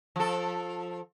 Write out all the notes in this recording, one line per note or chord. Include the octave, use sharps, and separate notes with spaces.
F3 A4